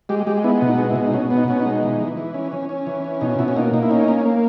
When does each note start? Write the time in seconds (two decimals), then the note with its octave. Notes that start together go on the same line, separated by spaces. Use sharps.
0.09 G#3 G4
0.27 G#3 G4
0.44 B3 E4
0.62 B2
0.67 D#4
0.78 G#3
0.90 E4
0.96 B2
1.07 D#4
1.14 B2 C#4
1.30 B3
1.37 D#4
1.48 B2 C#4
1.60 D#4
1.65 G#3
1.83 E3
2.00 E3
2.17 E3
2.34 C#4
2.52 C#4
2.69 C#4
2.87 E3
3.04 C#4
3.21 B2 D#4
3.39 B2 E4
3.48 C#4
3.56 A#3 D#4
3.74 A#3 D#4
3.83 E4
3.91 C#4 D#4
4.08 A#3
4.25 A#3